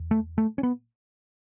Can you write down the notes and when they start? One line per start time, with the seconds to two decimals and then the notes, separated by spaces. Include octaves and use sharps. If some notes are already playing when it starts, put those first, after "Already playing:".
Already playing: E2
0.11 A3
0.38 A3
0.58 C#4
0.63 B3